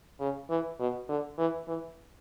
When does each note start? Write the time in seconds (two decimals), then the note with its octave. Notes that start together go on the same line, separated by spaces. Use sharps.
0.20 C#3
0.50 E3
0.79 B2
1.09 D3
1.38 E3
1.68 E3